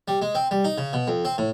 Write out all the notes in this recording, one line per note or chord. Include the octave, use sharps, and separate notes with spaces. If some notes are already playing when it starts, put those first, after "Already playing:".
G3
G#3
C4
G3
D#4
C#3
B2
F2
C4
A2